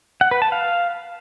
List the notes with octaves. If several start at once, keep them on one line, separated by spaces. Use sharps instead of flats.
F#5
B4
A5
F5